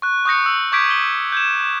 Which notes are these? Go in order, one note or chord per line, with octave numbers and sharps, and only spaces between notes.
C#6 F#6
C#6 D#6 G6 A#6 C#7
E6
C#6 D6 G6 G#6 B6 D7
G7
G6 G#6 E7